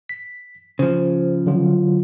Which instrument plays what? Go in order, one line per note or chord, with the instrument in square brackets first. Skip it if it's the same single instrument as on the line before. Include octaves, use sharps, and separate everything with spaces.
[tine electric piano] B6
[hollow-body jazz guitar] C#3 F3 [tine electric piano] C5
[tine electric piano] D3 F#3 F4